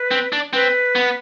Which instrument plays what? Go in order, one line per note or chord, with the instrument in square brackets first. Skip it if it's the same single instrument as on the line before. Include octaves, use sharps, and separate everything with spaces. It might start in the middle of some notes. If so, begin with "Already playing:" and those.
Already playing: [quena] B4
[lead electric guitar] C4
D4
[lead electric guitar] C4 [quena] B4
[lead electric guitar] B3